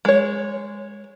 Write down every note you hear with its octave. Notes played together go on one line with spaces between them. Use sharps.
G#3 C#5